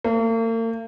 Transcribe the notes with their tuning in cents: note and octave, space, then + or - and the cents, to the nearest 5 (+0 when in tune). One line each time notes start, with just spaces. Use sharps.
A#3 -45